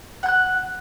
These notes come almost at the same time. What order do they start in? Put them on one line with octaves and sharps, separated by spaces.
F#5 G6 F#6